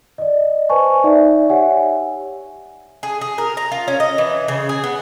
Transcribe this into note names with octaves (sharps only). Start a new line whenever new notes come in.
D5 D#5
B4 C5 G#5 A5 C#6
D#4 D5 E5
G4 C#5 E5 F#5 G#5
G#4
G#4
A#4
A#5
F4
C#4
D#5
E3
C#3
G#4
B3